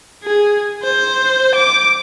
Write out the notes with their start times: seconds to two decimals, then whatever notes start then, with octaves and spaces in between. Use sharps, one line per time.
0.24 G#4
0.83 C5
1.55 D6